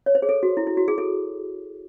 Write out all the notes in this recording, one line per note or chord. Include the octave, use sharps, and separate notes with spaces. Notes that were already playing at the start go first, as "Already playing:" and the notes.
C#5
C5
G#4
A4
F#4
E4
E4
F#4
G#4
A4